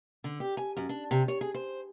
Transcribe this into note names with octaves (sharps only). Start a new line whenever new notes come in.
D3
G4
G#5
F#2
D4
C3
C#5
G#4
C5